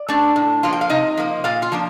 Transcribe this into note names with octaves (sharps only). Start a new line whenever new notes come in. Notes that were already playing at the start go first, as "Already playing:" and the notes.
Already playing: D5
A3 D4
A2
F3 A#3 F4
G5
F5
C3 D#4 D#5
F3 A#3
A#2 F4 F5
F4 F5
F3 A#3 D4